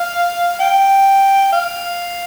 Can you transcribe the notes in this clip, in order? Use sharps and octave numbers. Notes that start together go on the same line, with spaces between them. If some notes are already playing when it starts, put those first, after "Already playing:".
Already playing: F5
G5
F5